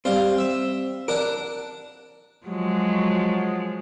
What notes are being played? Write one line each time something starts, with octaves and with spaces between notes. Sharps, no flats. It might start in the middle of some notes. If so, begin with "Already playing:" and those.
G3 C4 F4
E5
D4 A#4 F#5 D6
F3 F#3 G#3